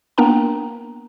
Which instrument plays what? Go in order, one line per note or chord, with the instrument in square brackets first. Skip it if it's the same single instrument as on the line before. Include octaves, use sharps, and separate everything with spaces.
[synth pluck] A#3 B3 D4 A#4 G5 A#5